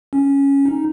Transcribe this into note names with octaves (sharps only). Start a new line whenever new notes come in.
C#4
D#4